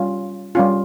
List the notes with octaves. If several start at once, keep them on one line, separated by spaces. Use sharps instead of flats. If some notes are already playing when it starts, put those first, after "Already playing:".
Already playing: G3 C#4 F4
G3 C#4 F4